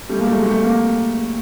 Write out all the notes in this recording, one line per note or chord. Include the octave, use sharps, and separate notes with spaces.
G3 A3
G#3 A#3
G3 A3
F#3 G#3
G3 A3
A#3